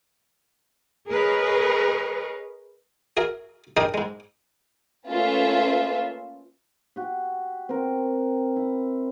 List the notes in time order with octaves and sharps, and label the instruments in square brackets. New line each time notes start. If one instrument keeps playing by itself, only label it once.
[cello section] G#4 A#4 B4 C#5 D#5
[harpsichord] F#4 G#4 A#4 E5
D4 D#4 G4 G#4 A#4 D#5
G#2 G#3
[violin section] A3 A#3 C#4 F4 B4 E5
[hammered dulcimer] F#4 G4
C4 A#4
E4